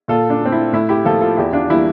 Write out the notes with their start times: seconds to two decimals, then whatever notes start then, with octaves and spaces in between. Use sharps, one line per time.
0.08 A#2 F4 A4
0.30 D4
0.42 A3 C4
0.52 E4
0.73 A2 E4
0.89 E4 G4
1.05 F3 A#3 F4 A4
1.21 F4 A4
1.37 E2 E4 G4
1.53 D4 F4
1.69 E3 G3 A#3 E4